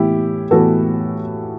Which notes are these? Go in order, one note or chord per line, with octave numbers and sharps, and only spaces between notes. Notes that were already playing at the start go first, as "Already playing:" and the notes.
Already playing: A2 E3 B3 E4 G4
A2 E3 B3 F#4 A4